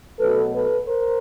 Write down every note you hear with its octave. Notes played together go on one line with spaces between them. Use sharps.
B2 F#3 A3 A4 B4
A4 B4
A#4 C5